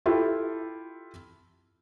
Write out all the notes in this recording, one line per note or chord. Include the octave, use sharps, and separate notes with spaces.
E4 F4 G4 A4